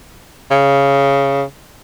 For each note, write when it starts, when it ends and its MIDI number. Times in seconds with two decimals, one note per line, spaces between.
0.51 1.43 49